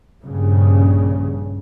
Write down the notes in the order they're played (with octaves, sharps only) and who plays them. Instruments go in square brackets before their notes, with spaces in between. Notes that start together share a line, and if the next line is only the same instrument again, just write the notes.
[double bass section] A#1 G2 C#3